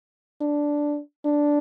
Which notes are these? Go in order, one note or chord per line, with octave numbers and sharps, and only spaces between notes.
D4
D4